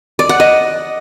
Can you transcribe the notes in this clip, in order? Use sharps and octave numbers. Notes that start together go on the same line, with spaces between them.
D5
F#5
D#5